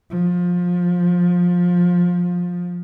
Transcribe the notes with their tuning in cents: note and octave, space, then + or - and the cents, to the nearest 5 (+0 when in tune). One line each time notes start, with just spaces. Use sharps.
F3 +20